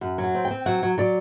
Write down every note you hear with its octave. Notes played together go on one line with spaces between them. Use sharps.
F#2 F#5
F#3
F#5
C4
G5
C4
F#3 F#5
F#3
F#3 D5